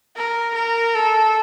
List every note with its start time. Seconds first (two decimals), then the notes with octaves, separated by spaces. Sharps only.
0.16 A#4
0.55 A#4
0.94 A4